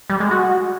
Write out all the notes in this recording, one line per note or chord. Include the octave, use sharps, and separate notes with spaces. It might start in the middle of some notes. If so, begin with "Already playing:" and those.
G3
G#3
F#4